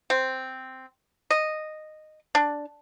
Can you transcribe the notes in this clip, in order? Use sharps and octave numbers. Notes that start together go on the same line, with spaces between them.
C4
D#5
D4